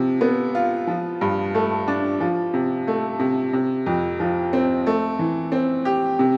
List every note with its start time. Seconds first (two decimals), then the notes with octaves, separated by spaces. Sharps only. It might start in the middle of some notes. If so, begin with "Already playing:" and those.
Already playing: C3 F3
0.21 B3
0.55 F4
0.87 F3
1.21 G2
1.54 A3
1.88 D4
2.20 F3
2.54 C3
2.87 A3
3.19 C3
3.53 C3
3.86 F2
4.20 F3
4.53 C4
4.86 A3
5.19 E3
5.52 C4
5.85 G4
6.19 C3